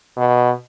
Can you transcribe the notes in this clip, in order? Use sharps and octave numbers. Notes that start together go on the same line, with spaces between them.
B2